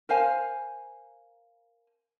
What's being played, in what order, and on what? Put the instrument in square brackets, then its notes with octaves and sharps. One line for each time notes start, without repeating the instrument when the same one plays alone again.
[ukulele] A#4 C5 F5 G#5